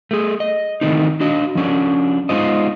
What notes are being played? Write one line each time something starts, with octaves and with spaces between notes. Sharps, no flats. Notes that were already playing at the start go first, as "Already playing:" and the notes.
A3 G#4
D#5
D#3 E3 A3 C4 D#4
D4 F#4 D#5
F3 C#4 D4
G#3 B3 D#4 F4 C5 D#5